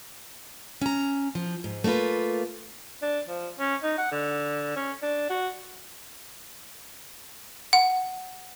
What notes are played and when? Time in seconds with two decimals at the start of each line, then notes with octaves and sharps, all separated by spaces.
0.82 C#4 A#5
1.35 F3
1.64 G#2
1.84 A3 A#3 D4 F4 B4
3.02 D4
3.28 F3
3.59 C#4
3.83 D#4
3.98 F#5
4.12 D3
4.76 C#4
5.02 D4
5.30 F#4
7.73 F#5